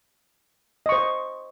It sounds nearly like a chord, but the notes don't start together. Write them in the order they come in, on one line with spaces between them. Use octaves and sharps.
D#5 C#6 C5